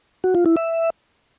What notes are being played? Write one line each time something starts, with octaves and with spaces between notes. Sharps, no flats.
F#4
F4
E4
E5